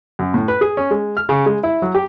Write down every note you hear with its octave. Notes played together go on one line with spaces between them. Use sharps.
F#2
A2
B4
G#4
C#4
G#3
F6
C#3
G#3
E4
F#3
G4